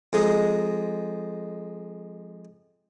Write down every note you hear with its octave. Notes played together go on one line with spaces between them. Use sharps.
F2 G#3 D#4